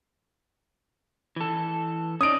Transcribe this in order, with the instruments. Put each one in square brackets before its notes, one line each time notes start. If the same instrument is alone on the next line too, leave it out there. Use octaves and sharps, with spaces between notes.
[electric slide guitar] E3 A4
[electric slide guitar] C#4 D#4 D5 [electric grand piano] D#6 D7